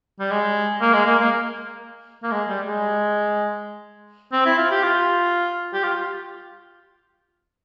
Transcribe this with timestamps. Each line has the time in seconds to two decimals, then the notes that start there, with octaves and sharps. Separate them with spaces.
0.20 G3
0.31 G#3
0.81 A#3
0.94 G#3
1.06 A#3
1.20 A#3
2.23 A#3
2.32 G#3
2.49 G3
2.66 G#3
4.32 C4
4.46 E4
4.58 F4
4.71 G4
4.83 F4
5.74 G4
5.83 F4